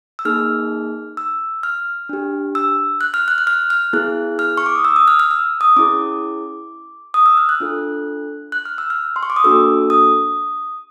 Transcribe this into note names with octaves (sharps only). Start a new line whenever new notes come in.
E6
A#3 D#4 G#4 F6
E6
F6
D4 G4
E6
F#6
F6
F#6
F#6
F6
F6
B3 E4 G#4 F#6
F6
C#6
D6
D#6
E6
D#6
F6
F6
E6
D#6
C#4 E4 G#4 D6
D#6
E6
F6
F#6
D4 F4 A4
F#6
F6
E6
F6
C6
C#6
D6
D#6
A#3 D4 F#4 A4 E6
D#6